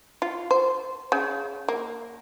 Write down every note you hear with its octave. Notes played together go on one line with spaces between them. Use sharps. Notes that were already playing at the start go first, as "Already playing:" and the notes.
F4
C5
C#3
A#3